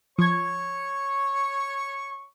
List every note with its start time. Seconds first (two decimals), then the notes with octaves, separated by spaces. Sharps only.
0.18 F3 C#5 C#6 G#6